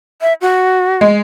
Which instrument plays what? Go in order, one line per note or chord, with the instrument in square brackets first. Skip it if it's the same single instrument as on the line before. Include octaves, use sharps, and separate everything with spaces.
[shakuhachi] E5
F#4
[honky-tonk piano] G#3